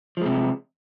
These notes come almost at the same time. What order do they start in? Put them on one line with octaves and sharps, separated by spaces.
F3 G#3 C3